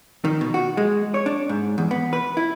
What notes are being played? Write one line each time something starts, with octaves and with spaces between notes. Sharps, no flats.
D#3
B2
F#4
G#3
C#5
D4
G#2
E2
B3
B4
E4